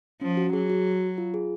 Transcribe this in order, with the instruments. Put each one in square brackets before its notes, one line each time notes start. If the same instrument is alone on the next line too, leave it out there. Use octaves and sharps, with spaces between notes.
[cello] F3 [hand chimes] C#4
[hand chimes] F#4
[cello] F#3 [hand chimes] G#4
[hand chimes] F#4
F4
G#4